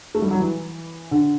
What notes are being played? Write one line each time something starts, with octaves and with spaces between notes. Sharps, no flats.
A3
G3
F#3
E3
D3